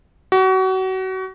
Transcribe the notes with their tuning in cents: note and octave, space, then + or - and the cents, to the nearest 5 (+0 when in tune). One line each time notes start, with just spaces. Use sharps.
F#4 +30